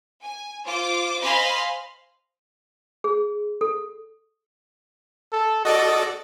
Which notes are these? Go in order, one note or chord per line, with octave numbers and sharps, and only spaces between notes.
G#5
F4 C5 D6
C5 D#5 F5 G#5 B5 C6
G#4
A4
A4
F#4 A4 D5 D#5